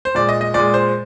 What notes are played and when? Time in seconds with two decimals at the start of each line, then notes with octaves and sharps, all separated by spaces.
0.05 C5
0.15 A#2 G#3 D5
0.29 D#5
0.41 D#5
0.54 A#2 G#3 D5
0.74 C5